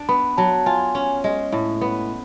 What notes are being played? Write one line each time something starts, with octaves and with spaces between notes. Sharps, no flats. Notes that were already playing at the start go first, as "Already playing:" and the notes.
Already playing: D4
B3 B5
F#3 A5
F4 G#5
C#4
G#3
A2
B3